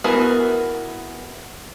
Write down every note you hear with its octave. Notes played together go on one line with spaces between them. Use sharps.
E3 B3 F#4 G#4 A#4